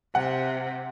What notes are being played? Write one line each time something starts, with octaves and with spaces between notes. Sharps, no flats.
C3 F#5